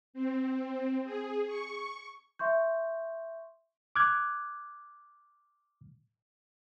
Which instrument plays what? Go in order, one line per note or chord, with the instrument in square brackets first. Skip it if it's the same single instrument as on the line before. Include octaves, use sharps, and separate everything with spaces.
[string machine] C4
G#4
C#6
[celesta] E5 C6 C#6 G6
[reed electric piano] D6 F6 F#6 G#6